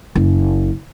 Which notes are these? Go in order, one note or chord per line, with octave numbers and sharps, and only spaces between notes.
F#1